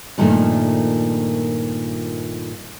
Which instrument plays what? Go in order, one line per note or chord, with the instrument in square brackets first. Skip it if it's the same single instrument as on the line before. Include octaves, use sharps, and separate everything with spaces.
[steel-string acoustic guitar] G2 A#2 D#3 F3 A3